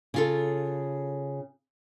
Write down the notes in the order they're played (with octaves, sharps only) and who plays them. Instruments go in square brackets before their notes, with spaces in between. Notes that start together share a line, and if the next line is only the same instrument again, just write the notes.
[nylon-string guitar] C#3 F4 A4